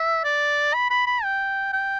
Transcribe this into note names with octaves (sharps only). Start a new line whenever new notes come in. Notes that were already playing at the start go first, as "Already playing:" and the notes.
Already playing: E5
D5
B5
B5
B5
G5
G5